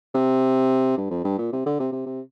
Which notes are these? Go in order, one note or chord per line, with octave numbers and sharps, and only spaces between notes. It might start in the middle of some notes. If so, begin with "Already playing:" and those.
C3
G2
F2
G2
A#2
C3
D3
C3
C3
C3